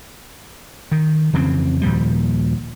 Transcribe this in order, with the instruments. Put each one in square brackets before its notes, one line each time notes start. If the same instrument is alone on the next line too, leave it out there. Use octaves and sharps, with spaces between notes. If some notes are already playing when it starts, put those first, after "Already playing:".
[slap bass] D#3
F2 C#3 E3 C4
D#2 A#2 F3 G3